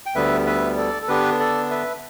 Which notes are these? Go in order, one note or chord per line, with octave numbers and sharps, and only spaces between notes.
G5
D2 D3 G3 B3 B4 E5
B4 E5
A4 D5
A4
D3 B3 D4 G4 B4
A4 D5
B4 E5